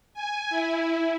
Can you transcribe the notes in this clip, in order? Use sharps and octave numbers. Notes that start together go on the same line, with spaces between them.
G#5
E4